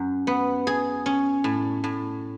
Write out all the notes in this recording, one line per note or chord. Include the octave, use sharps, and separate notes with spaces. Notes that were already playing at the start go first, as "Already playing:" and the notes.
Already playing: F#2
B3
G#4
C#4
A2
A2